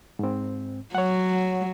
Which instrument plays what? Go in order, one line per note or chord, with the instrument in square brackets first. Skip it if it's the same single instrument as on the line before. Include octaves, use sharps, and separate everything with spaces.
[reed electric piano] G#2 C4
[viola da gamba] F#3 [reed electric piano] C#5 F#5